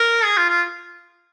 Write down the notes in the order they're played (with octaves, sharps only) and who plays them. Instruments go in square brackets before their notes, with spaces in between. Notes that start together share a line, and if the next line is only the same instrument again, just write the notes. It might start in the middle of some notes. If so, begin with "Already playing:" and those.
Already playing: [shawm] A#4
G#4
F4
F4